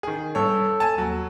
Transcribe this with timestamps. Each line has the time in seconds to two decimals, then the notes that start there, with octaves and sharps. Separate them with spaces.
0.03 D#3 G#4
0.35 G2 A4 C#5
0.80 G#5 A5
0.98 D#2 F#3